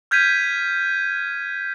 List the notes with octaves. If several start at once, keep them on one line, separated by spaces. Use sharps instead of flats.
F6 G6 G#6 B6 D#7